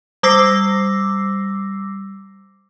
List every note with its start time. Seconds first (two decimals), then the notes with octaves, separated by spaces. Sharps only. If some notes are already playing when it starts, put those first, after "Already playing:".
0.23 G3 D6 E6 A#6 C7